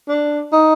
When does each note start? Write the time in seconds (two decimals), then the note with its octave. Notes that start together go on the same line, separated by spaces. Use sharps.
0.08 D4
0.53 D#4